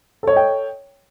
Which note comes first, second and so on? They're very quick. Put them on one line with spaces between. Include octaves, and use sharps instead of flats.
A4 C#5 D#5 G5